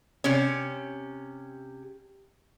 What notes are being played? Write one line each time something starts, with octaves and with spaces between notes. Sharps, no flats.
C3 C#4